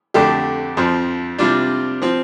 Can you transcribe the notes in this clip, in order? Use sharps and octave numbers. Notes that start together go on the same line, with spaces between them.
F2 D3 A3 D4 G4
F2 F3 C4
C3 G3 D4 F4
F3 C4